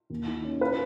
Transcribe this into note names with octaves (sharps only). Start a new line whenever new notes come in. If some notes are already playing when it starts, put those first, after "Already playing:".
D#2
D#3
C#4
B4